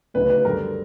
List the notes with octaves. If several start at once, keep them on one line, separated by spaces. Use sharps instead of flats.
D2 C#3 F#3 B3 D#4 B4
B4
F#2 D3 G3 A#4